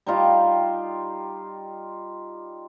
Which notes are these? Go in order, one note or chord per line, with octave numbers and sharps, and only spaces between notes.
G3 D#4 F4 G4